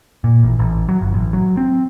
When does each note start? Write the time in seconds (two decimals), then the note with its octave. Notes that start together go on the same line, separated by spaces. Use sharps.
0.24 A#2
0.43 A1
0.59 A1
0.89 F#3
1.01 G1
1.14 A1
1.33 F#3
1.57 C4